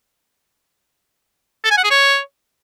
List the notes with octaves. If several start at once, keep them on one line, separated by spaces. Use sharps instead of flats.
A4
G#5
F#5
G#4
C#5